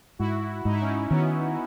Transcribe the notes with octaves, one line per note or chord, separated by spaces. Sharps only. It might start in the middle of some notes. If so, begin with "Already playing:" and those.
G#2 E4 F#4
G#2 D#4
E4
C#4 D#4
D#3 B3 C#4